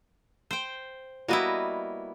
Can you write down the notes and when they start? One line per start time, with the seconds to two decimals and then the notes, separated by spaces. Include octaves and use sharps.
0.51 C5 G5
1.28 G3 A#3 B3 E4 F#4 D#5